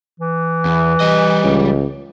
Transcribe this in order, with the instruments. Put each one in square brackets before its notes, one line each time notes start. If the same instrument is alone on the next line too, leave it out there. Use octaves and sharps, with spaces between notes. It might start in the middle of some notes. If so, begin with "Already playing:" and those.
[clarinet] E3
[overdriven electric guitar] E2
G3 D#5
[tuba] C#2